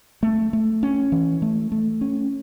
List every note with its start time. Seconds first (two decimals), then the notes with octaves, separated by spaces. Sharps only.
0.23 A3
0.53 A3
0.83 C#4
1.12 E3
1.42 A3
1.72 A3
2.01 C#4